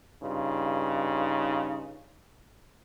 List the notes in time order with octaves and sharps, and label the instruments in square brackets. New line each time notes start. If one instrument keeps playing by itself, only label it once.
[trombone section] G2 C#3 D#4 F4